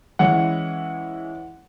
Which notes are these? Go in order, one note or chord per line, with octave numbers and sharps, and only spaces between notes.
E3 G#3 C#4 E4 F#5